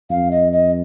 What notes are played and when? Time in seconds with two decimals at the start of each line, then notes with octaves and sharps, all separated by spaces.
0.10 F2 F5
0.31 D#5
0.53 D#5